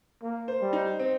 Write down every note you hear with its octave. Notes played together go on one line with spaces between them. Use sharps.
A#3
C5
G3
D#4
C4